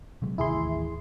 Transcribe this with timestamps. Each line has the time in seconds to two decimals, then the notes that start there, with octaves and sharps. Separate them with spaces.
0.22 C3 F#3 G#3
0.38 A1 D#2 E4 G#4 C6